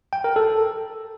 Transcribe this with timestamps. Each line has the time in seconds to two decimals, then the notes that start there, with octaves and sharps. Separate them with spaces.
0.13 G5
0.24 A#4
0.36 A4